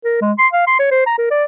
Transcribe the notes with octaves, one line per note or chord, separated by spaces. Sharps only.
A#4
G#3
C6
F5
C6
C#5
C5
A#5
A#4
D5